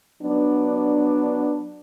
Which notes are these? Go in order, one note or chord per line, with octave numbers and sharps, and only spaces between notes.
F#3 B3 D4